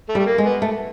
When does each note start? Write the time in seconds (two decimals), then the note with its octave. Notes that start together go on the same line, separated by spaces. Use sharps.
0.09 A3
0.15 G3
0.19 A3
0.26 A#3
0.38 G#3
0.44 B3
0.62 A3